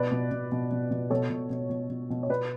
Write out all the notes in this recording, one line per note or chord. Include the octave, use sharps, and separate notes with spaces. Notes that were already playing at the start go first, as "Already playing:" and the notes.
Already playing: B2 B4 D5
B2
B2
B2
B2
B2
B2 A4 C#5
B2
B2
B2
B2
B2
C#5
B2 B4 D5